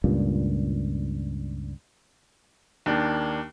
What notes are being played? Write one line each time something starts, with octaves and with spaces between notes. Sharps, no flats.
C#2 G2 A#2
D#2 A#3 D4